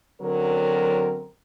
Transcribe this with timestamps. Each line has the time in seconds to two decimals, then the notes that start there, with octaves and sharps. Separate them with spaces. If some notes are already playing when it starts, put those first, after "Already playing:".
0.22 F#2 D3 F#3 C4 A#4